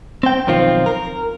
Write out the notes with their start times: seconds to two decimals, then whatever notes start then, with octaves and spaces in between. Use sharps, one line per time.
0.23 C4 G5
0.47 B1 D#3 F3 C4 F4
0.86 A#4